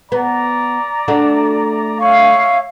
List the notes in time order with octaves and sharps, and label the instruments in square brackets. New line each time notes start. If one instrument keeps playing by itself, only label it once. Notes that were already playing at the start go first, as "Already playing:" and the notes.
[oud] B3 [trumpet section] D5 A#5
[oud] A3 D4 F#4
[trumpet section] C#5 E5 C#6 [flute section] F5